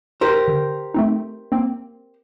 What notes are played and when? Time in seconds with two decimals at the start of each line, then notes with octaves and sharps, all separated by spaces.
0.21 G4 A#4 C5
0.48 D3
0.94 A3 C4 D#4
1.52 A#3 C4